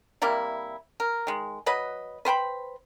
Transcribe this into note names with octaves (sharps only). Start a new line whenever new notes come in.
C3 G3 A#3 E4
A#4
D#3 G#3
F#3 B4 D#5 B5
B4 C5 G5 B5